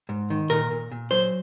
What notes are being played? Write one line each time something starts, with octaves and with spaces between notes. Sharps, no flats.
G#2
D#3
A#2 A#4
A#2
A#2
F#3 C5